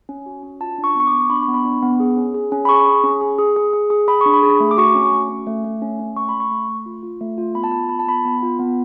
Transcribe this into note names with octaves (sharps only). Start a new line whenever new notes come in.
C#4
F#4
C#4
F4 A5
D4
C#6
B3 C#6
D6
B3
D4 B5
C#6
B3
B5
D4
B3
G#4
C#4
G#4
C#4
B5
G#4 C#6
G#4
C#4
G#4
G#4
G#4
G#4
G#4
G#4 B5
D4 C#6
B5
G#4
A3
D6
F#4 C#6
C#4
A3
C#4
A3
A3
C#4
C#4
A3 C#6
B5
A3
C#6
A3
A3
F4
F4
A3
F4
B3 B5
A5
F4 B5
F4 B5
A5
B3 B5
B3
F4
B3